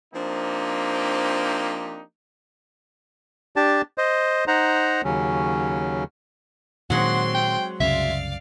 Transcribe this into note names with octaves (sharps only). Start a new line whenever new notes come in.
F3 A#3 C4 D4 D#4 G4
D4 G4 A5
C5 D#5
D#4 C5 F#5 A#5
D#2 C#3 F#3 C#4
A#2 D#3 F#3 G#3 C4 F#5 C6
G5
C2 F#2 C#3 D5 E5 F5